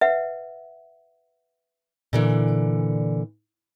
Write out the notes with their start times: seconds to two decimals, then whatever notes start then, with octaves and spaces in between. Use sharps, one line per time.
0.01 B4 E5 F#5
2.13 A#2 D3 E3